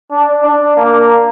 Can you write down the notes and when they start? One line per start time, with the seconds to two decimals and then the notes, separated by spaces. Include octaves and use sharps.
0.11 D4
0.44 D4
0.77 A#3